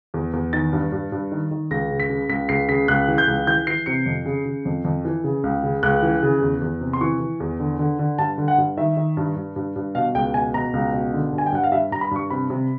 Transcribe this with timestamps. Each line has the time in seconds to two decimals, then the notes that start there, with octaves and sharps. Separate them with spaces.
0.14 E2
0.33 E2
0.53 D#3 A6
0.73 G2
0.92 G2
1.12 G2
1.32 D#3
1.51 D#3
1.71 C#2 A#6
1.91 C#3
2.00 B6
2.10 C#3
2.29 C#2 B6
2.49 C#2 C7
2.69 C#3 B6
2.88 C#2 F#6
3.08 E3
3.18 G6
3.28 C#2
3.47 E3 G6
3.67 E3 C7
3.86 C3 C#7
4.06 F2
4.26 C#3
4.45 C#3
4.65 F2
4.85 F2
5.05 E3
5.24 C#3
5.44 C#2
5.63 C#3
5.83 C#2 F#6
6.02 E3
6.23 C#3
6.42 E2
6.61 E2
6.81 C3
6.93 C6
7.01 E3 C#6
7.20 E3
7.40 E2
7.60 D3
7.79 D3
7.99 D3
8.18 G2 A5
8.38 D3
8.48 F#5
8.58 G2
8.77 D#3 E5
8.97 D#3
9.17 G2
9.36 G2
9.56 G2
9.76 G2
9.95 B2 F5
10.15 C#2 G5
10.34 B2 G#5
10.54 B2 A#5
10.73 C#2
10.93 B2
11.13 D3
11.33 G2
11.38 G#5
11.46 G5
11.52 G2 F#5
11.64 F5
11.72 G2 E5
11.91 G2 A#5
12.01 B5
12.11 G2 C#6
12.30 C3 B5
12.50 C3